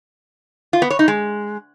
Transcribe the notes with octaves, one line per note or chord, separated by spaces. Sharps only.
F4
B3
C#5
D#4
G#3